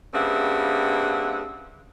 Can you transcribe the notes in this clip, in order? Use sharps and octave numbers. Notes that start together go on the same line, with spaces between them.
G2 C#3 A#3 C4 E5 F#5